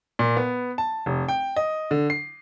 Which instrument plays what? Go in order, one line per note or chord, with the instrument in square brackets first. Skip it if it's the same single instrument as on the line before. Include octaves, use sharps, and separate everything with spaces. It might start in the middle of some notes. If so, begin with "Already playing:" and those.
[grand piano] A#2
B3
A5
F1
G5
D#5
D3
C7